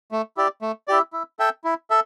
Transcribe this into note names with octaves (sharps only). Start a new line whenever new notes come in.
A3
E4 G4 D5
A3
E4 G4 D5
E4
A4 E5 G5
E4
A4 E5